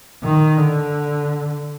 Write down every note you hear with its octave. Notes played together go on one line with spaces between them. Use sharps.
D#3
D3